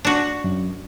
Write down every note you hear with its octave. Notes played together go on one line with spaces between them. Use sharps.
D4 F#4
F#2